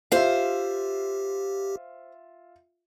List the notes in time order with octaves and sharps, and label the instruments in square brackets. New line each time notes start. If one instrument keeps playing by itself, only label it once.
[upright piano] F4 E5 [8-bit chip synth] G4 [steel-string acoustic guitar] C5 F5